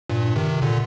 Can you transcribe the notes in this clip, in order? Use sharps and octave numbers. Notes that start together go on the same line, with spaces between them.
G2 A#2
C3 D#3
A#2 D3